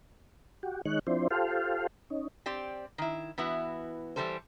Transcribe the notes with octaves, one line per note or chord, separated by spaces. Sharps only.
F#4 G4
D#3 G#3 D#4 C#5 F#6
F3 C4 D4 E4 C5
F4 G4 A4 C5 F5
C#4 D#4
C4 G4 D5
D#3 E4
E3 B3 E4 F#4
E3 G3 G4 A4 C5